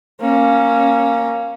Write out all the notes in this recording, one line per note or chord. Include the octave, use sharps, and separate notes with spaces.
A#3 C#4